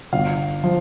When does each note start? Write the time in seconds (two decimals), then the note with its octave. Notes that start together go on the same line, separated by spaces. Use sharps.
0.13 G1 F5
0.64 F3